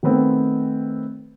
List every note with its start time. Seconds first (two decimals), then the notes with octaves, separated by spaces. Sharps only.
0.03 D#3 A3 B3 C4